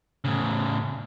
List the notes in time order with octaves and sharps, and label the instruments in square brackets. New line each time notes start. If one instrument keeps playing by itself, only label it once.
[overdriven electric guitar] A2 C#3